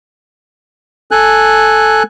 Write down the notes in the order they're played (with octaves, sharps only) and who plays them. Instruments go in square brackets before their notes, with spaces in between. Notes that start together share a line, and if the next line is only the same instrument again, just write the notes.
[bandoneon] A4 G#5 F#6